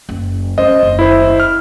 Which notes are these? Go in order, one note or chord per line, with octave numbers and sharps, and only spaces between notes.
F#1
C#4 F4 C5 D#5
F#1 D#2
E4 C5
F6